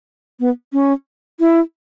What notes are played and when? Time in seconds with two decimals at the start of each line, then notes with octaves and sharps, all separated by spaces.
0.40 B3
0.73 C#4
1.40 E4